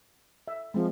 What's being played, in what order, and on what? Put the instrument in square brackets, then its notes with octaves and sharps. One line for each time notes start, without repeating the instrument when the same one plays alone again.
[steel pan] E5
[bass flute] F3 [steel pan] G#3 C4